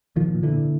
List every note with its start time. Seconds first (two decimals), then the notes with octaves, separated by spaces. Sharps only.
0.16 A#2 D#3 F3
0.35 A#2
0.43 D3 E3
0.52 A#2